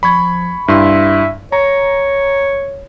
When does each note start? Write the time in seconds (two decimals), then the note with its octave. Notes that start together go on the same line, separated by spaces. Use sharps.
0.03 F3 B5 C#6 G#6
0.68 G2 E4 E5 C6
1.52 C#5 A#5